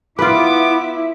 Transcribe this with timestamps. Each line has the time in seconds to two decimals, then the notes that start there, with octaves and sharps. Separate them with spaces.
0.19 B3 E4 F4 B4 D6